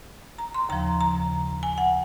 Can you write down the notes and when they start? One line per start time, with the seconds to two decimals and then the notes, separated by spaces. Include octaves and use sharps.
0.38 A#5
0.54 C6
0.69 D#2 C#3 F3 A#5
1.01 A#5
1.63 G#5
1.78 F#5